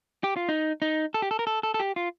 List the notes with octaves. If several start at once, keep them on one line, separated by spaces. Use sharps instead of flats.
G4
F4
D#4
D#4
A4
G4
A4
A#4
A4
A4
A4
G4
F4